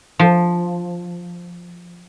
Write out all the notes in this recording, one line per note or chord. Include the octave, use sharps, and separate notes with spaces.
F3